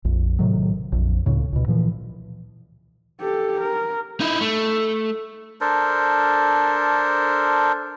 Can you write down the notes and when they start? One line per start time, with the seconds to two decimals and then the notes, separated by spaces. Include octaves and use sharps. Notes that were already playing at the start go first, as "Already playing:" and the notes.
0.05 A#1 F2
0.39 A2 C3 D#3 F#3
0.92 A#1 F2
1.26 C#2 A2 C#3
1.53 C#2 B2
1.68 A#2 E3 F3
3.21 G4 A4
3.60 A#4
4.20 D#4 E4
4.41 A3
5.61 D4 A4 A#4 C5